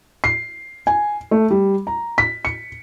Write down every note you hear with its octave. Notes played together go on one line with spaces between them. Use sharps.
C7
G#5
A3
G3
A#5
B6
C#7